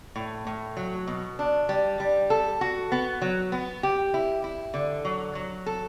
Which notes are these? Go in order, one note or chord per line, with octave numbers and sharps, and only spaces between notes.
A2
A2
F#3
B2
D4
G3
G3
A4
F#4
B3
F#3
B3
G4
E4
E4
D3
F#3
F#3
A4